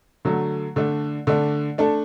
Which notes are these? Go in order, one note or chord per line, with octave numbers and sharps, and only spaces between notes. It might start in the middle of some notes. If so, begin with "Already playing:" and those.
D3 F#3 A3
D3 A3 D4
D3 A3 D4
A3 D4 A4